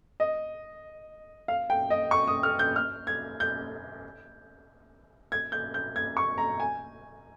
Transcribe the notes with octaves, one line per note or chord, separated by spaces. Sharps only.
D#5
F5
G5
D#5
C#6
D#6
F6
G6
F6
G#6
G6
G#6
G6
G6
G#6
C#6
A#5
G#5